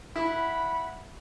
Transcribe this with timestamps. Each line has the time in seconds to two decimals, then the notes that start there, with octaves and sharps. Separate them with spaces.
0.16 E4 F#5 B5